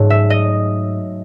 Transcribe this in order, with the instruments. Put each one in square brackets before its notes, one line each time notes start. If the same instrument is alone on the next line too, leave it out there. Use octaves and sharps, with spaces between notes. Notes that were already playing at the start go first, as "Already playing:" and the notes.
Already playing: [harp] G#2 F#3 A3 C#5
E5
D#5